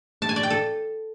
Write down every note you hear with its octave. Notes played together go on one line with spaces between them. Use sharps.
A5
G#5
D5
G5
A4